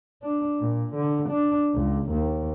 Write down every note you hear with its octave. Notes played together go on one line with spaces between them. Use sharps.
D4
A#2
D3
D4
C#2
D#2